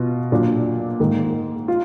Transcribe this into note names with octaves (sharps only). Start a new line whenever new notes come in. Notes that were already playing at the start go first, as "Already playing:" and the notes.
Already playing: B2 F4
A#2 F#3 D4 F4
G#2 D#3 A#3
F4